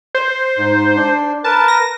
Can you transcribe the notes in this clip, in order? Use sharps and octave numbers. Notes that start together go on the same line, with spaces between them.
C5
G#2
D4
A#4 B4 A5
A#6